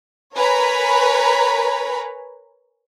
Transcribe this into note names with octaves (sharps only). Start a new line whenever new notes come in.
A#4 B4 C#5 G#5 A#5 B5